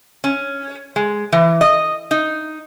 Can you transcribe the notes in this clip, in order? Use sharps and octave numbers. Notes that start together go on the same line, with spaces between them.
C#4
G#3
E3
D#5
D#4